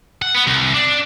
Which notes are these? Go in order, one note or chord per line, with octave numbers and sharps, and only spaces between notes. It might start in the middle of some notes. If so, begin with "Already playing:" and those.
F#5
B3
C2
D4